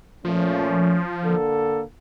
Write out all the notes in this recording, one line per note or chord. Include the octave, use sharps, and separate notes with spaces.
A#2 F3 A3 C#4
D3 A#3 A4